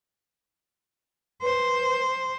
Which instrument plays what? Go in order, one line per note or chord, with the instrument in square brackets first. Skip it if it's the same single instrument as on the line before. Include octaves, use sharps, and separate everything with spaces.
[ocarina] B4 [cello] C5